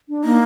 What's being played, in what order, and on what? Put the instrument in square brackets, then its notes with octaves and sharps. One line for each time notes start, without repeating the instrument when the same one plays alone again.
[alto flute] D4
[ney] A#3 [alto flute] D#4